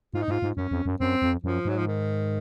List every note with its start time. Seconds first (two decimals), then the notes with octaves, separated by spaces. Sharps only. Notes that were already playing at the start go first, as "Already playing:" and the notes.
0.14 G#2 F4
0.22 D#4
0.28 G#2 F4
0.42 G#2
0.57 F#2 C#4
0.71 F2
0.86 F#2
1.00 F#2 C4
1.22 F2
1.44 F#2 F3
1.65 G#2 F#3
1.78 F3
1.87 D#3